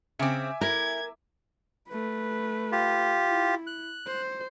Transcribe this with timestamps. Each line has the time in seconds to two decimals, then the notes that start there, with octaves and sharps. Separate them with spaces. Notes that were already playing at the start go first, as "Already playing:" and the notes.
0.19 C#3 C4 E5 G#5 D6
0.61 E4 A#4 G#6
1.90 A3 B4
2.72 F4 G4
3.28 E4
3.67 F#6
4.07 C5